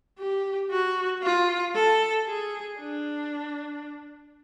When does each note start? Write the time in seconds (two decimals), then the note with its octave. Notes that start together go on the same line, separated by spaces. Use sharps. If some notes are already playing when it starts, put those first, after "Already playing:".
0.18 G4
0.71 F#4
1.23 F4
1.75 A4
2.27 G#4
2.78 D4